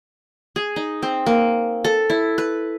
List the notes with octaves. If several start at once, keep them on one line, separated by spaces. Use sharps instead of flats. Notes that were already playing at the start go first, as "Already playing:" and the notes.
G#4
D#4
C4
A#3
A4
E4
B4